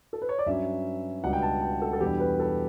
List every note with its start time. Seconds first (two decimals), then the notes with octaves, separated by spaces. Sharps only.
0.13 A4
0.22 B4
0.29 C#5
0.39 D5
0.46 G2 F#3 C#4 E5
1.24 C#2 B2 G3 D4 F#5
1.33 G5
1.42 A5
1.62 G5
1.82 A4
1.93 A4
2.00 E2 B2 G3 D4 G4
2.20 B4
2.40 A4